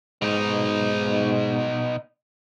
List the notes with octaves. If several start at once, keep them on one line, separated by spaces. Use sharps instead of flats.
G#2 B2 D#4